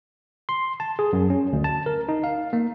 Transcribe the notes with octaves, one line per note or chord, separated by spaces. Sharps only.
C6
A5
G#4
F#2
C#4
D2
A5
A#4
D#4
F5
A#3